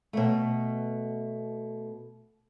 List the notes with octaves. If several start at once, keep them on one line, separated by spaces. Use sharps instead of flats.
B2 A3